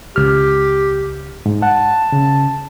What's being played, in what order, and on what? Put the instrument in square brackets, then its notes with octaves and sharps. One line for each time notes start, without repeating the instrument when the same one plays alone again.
[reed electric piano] C#2 F6 [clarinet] G4
[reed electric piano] G#2
[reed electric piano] F#5 [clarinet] A5
[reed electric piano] C#3